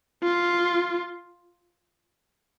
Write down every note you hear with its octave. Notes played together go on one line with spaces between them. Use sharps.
F4